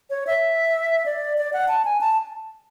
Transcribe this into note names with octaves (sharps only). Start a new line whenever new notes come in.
C#5
E5
D5
D5
F#5
A5
G#5
A5